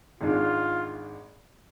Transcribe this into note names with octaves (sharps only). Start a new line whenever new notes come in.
G#1 G#2 D#3 G#3 D4 F4